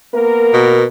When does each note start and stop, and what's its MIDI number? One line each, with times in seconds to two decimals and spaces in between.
0.14 0.84 58
0.14 0.84 59
0.14 0.84 70
0.54 0.84 47